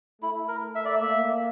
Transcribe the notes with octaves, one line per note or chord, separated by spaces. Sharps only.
A3 E4
A#4
E5
D5
E5
A#3